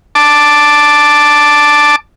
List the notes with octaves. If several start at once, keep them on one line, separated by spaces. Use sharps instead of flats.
A5 D6